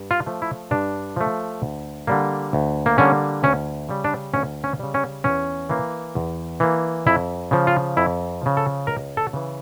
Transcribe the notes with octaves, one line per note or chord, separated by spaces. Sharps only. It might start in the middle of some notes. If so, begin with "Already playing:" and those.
Already playing: G2
F4
F3 A3
E4
G2 D4
F3 A3
D2
D3 G3 A#3
D2
A#3
D3 G3 A#3 C#4
D2 C#4
C#3 G3
D4
D2 C#4
C#4
C#3 G3
C#4
E2 C#4
E3 A#3
E2
E3 A#3
F2 E4
C#3 F3
F4
F2 E4
C#3 F3
A4
C#2 A#4
A4
C#3 E3